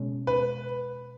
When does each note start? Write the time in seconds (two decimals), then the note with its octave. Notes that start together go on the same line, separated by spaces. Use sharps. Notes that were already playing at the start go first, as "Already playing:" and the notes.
Already playing: B2 G#3 C#4
0.27 B4